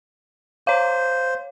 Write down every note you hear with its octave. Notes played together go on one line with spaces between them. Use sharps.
C5 C#5 F5